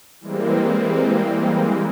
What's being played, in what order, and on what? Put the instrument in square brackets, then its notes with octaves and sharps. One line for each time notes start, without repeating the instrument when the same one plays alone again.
[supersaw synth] E3 G3 G#3 A#3 C4